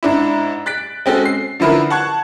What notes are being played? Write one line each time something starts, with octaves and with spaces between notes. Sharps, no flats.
G#2 D4 E4
F#6 A6 B6 D7
G#3 C4 C#4 F#4 A4
C7
D3 F3 E4 A#4 B4
F#5 A5 C#6 F#6 G#6